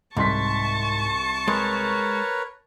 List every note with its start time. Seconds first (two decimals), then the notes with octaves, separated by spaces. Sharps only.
0.17 C2 G#2 A5 C6 C#6 B6
1.48 G#3 A#4 B4 C#5